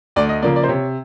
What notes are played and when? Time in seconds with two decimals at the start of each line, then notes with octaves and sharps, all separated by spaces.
0.16 D2 D5
0.29 D#5
0.42 C#3 F3 A#3 D5
0.56 D5
0.64 C5
0.68 C3 C#5